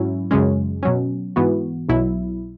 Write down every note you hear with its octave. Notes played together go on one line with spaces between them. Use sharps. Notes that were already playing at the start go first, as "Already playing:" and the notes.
Already playing: G#2 F#3 C#4 E4
F#2 C#3 G#3 C#4
B2 F#3 C#4
G#2 E3 B3 F#4
B1 B2 F#3 E4